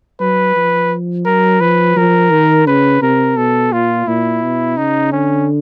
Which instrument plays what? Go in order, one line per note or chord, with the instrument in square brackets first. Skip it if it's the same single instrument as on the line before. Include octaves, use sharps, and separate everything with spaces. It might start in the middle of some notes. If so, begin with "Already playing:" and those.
[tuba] F#3 [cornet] B4
[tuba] F3
[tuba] F#3 [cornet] A#4
[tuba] F3 [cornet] B4
[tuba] F3 [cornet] A#4
[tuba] D#3
[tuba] C#3 [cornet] B4
[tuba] C3 [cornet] A#4
[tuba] B2 [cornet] A4
[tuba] A#2 [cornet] F4
[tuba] A#2 [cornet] E4
[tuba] B2
[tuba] C#3 [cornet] D#4
[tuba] D3 [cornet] C#4